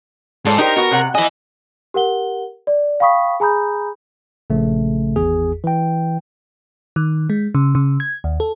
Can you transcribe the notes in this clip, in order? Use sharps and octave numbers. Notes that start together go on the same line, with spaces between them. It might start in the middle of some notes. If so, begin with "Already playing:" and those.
G#2 F4 A4 D5
D#4 G4 A#4 C5
B3 F#4
C3 F#5
E4 D#5 G#5
G4 A#4 F#5 G7
D5
F5 G5 B5 C#6 D#6 B6
G#4 G#5 A#5 B5 D#6 G6
A#1 C#3 A3
G#1 E2 G#4
E3 G5
D#3
G#3
C#3
C#3
G#6
D#2
A4